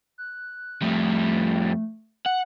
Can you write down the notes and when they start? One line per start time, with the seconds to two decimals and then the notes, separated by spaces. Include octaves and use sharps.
0.18 F#6
0.82 F2 G3 A3
2.26 F#5